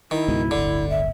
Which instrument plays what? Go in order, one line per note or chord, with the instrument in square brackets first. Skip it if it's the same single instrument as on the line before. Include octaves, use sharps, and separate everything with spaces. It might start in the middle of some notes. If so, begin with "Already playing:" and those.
[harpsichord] D#3 [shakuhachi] E4
[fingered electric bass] C#2 G#2 B2
[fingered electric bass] D1 G1 [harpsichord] D3
[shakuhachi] E5